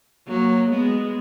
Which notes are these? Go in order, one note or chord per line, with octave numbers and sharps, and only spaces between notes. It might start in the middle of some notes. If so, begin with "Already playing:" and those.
F#3 A#3
G#3 B3